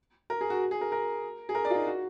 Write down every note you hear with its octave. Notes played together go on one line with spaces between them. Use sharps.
A#4
G#4
F#4
G#4
A#4
A#4
G#4
A#4
D5
F4
D#4
F#4